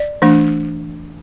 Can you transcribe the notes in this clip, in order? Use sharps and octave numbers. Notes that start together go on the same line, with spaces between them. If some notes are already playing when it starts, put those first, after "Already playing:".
Already playing: D5
E3 A3 D4